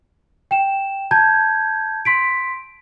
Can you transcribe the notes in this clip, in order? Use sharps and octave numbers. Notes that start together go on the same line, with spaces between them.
G5 E7
A5 A#5 G6 G#6
C6 B6 D7